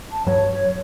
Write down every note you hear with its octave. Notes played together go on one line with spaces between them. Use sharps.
A5
G2 F#3 C#5